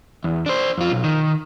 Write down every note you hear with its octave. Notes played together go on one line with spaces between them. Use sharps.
E2
D4 C5
F2 F4
B1
D#3